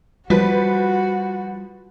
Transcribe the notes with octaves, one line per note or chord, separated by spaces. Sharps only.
F3 G3 F#4 B4